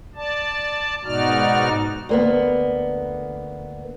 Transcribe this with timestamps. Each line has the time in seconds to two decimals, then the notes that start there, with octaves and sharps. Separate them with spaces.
0.16 D5 A5
1.05 G#2 B2 D#4 F#4 D5 F6
2.09 D2 A#3 B3